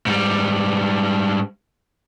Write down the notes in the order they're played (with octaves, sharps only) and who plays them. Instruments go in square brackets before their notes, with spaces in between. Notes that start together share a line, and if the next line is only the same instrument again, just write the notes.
[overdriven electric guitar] G#2 G3